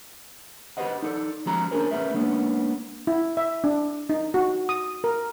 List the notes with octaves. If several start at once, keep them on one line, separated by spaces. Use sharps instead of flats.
G4 A4 B4 C5 D#5 F#5
D#4 A4 D5
F3 G#3 C#4 G4 A#5
C#4 D4 G4 G#4 A#4 C5
A3 C#4 G#4 B4 E5
G#3 A#3 B3 C#4 D4
E4
E5
D4
D#4
F#4
D#6
A#4